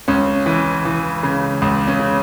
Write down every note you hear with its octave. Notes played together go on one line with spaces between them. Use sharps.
C#2 C#4
E3
E3
C#3
C#2
C#4
C#3